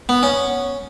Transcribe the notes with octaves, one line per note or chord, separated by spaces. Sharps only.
B3
C#4